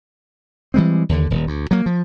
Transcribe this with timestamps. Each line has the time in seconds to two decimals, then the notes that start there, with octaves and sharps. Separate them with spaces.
0.74 E3 G3 G#3 C4
1.09 D#2 D3
1.30 D#1
1.47 D2
1.71 F#3 A#3
1.86 F3